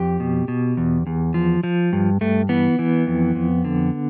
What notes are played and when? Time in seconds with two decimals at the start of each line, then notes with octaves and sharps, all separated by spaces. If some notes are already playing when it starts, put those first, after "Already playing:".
Already playing: F2 G4
0.20 B2
0.48 B2
0.77 E2
1.07 E2
1.34 F3
1.63 F3
1.93 G2
2.21 G2 A3
2.49 E3 B3
2.79 E3
3.07 F2
3.35 F2
3.65 D3